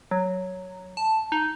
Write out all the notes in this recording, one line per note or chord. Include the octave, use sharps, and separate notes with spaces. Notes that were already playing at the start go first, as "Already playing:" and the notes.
F#3
A5
D#4